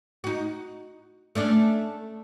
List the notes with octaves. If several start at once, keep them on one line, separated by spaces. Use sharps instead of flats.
D#4 F#4
A3 C#4 D4